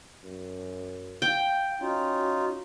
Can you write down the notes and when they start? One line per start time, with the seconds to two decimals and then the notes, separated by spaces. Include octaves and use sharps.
0.24 F#2
1.22 F5 G5
1.81 C#4 D#4 F4 F#4